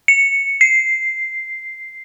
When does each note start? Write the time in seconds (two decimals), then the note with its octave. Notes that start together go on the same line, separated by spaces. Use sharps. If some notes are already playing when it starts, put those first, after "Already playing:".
0.08 C#7
0.61 C7